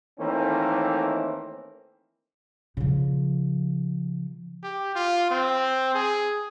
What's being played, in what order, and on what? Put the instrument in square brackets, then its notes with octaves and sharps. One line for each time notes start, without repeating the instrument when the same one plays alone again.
[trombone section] D#3 E3 A3 A#3 C4 C#4
[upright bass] C#3 F3
[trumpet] G4
F4
C4
G#4